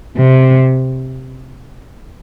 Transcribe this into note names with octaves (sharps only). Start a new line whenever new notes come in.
C3